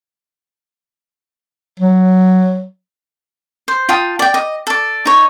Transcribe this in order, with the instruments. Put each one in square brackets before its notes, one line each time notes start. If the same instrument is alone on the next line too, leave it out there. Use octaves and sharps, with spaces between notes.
[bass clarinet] F#3
[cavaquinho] C5
F4 G5 A5 D#6
D5 G5
D#5
A4 D5
D#4 C#5